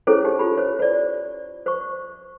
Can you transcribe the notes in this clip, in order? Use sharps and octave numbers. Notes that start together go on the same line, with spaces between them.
C#4 E4 G#4 A4 C5 C#5
D#4 G4 C5
F4 G4 B5
C5 C#5
C5 D5
C5 C#6